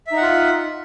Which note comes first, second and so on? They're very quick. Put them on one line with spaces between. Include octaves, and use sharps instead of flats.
E5 D#4 F#5 F4